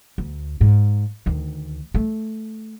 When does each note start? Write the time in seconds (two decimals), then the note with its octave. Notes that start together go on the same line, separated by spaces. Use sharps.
0.18 D2
0.61 G#2
1.26 D2 D#3
1.94 A3